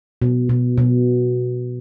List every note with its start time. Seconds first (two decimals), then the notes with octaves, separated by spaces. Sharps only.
0.22 B2
0.49 B2
0.78 B2